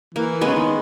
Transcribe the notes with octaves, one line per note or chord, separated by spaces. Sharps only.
E3 A#3
C#3 G#3 B3
D#3